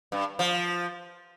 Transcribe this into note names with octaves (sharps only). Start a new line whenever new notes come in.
G2
F3